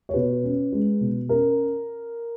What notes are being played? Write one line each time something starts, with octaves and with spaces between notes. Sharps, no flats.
C#5
B2 B4
C#4
G#3
B2
C#4 A#4